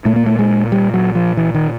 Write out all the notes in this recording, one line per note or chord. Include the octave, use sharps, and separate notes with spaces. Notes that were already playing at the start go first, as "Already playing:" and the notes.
A#2 A3
A#3
A3
G#3
G3
F#3
F3
E3
D#3